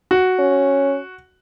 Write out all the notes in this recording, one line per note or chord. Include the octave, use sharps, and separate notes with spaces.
F#4
C#4